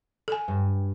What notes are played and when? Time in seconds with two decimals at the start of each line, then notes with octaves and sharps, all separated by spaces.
0.28 A4 G#5
0.48 G2